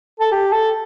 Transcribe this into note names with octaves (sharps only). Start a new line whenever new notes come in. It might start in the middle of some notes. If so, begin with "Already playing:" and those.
A4
G4
A4